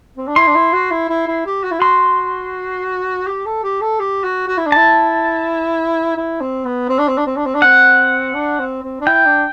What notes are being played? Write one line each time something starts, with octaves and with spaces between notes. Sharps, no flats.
C4
D4
E4 C6
D4
E4
F#4
E4
E4
E4
G4
F#4
E4
F#4 C6
G4
A4
G4
A4
G4
F#4
F#4
E4
D4
E4 A5
E4
C4
B3
C4
D4
C4
D4
C4
D4
C4
D4
C4 F#5
D4
C4
C4
D4
E4 G5
D4